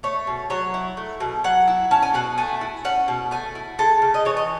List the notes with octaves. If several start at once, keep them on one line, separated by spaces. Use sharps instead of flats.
A3 C#5
B2
F#3 C#5
E4
A3
B2
F#3 F#5
E4
C#4 A5
G#5
B2 F#5
A3 G#5
E4
C#4 F#5
B2
A3 G#5
E4
G#3 A4
C#3
D#5
E3 C#5
D#5